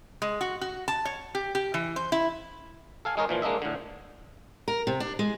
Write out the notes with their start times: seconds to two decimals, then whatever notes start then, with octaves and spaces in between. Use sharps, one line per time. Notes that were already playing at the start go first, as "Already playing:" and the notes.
0.22 G#3
0.41 F#4
0.61 F#4
0.88 A5
1.05 C#5
1.35 G4
1.55 G4
1.74 E3
1.96 C5
2.12 E4
3.05 A4 F5 G#5
3.17 G#3 D#4 G#4 A#4 C#5
3.29 A#2 E3 F3
3.42 G#3 A#3 D4 D#5 E5
3.62 A2 D3
4.68 A#4
4.87 C3
5.00 D4
5.19 G#3